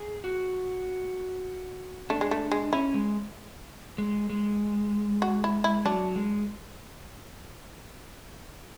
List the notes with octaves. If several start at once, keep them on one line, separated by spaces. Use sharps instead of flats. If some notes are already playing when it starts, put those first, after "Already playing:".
Already playing: G#4
F#4
A3 D4
G#3
A3
G#3
C#4 E4
G#3
G#3
G#3
F#4
E4
E4
F#3 D4
G#3